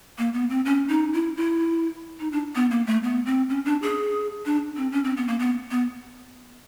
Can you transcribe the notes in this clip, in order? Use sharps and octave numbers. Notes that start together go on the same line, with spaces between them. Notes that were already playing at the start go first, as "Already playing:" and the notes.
A#3
B3
C4
C#4
D#4
E4
E4
D#4
D4
B3
A#3
A3
B3
C4
C#4
D4
G#4
D4
C4
C#4
C4
B3
A#3
B3
B3